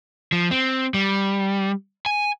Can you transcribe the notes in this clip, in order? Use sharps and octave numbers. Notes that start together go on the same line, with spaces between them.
F3
C4
G3
G#5